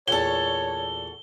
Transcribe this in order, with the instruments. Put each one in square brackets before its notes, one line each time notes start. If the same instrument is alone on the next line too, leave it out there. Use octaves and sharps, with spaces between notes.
[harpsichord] E2 A#2 [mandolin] F#4 A4 [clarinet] C#5 [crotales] G7